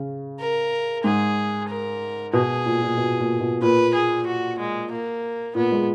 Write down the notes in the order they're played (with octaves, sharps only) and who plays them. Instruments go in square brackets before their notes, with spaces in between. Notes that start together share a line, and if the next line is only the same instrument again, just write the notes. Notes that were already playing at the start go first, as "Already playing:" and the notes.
Already playing: [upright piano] C#3
[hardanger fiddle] A#4
[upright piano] G#2 [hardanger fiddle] G#4
[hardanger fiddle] A#4
[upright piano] B2 [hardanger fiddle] G#4
[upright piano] A#2
A#2
B2
A#2
B2
[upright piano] A#2 [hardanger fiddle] B4
[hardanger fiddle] G#4
F#4
G#3
A#3
[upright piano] A#2 [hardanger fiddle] B3
[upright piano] G#3